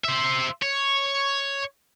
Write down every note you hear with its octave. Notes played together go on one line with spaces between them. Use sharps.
C5 E5
C#5